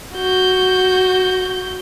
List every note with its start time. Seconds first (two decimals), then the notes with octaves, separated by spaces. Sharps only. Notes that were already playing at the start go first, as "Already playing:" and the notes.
0.15 F#4 G6